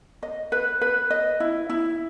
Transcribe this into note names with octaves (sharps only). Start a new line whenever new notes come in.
D#5
B4
B4
D#5
E4
E4